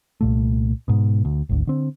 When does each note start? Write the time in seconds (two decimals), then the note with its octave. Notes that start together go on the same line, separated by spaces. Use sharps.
0.21 C2 A#2 A3
0.88 G#2 B2
1.25 D2
1.49 G#1 D2
1.67 D3 C4